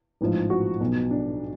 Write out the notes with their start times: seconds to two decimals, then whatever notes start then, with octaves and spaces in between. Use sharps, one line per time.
0.21 A1 G#2 F3
0.50 F#4
0.80 B1 B2
1.11 D4